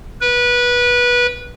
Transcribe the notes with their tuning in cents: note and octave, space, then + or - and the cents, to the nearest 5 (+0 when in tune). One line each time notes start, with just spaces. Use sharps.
B4 -20